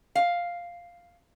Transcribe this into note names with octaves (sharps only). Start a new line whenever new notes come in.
F5